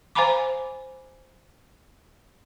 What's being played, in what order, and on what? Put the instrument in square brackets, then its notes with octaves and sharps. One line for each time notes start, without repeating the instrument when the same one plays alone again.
[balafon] C5 F5 G#5 A#5 B5 D6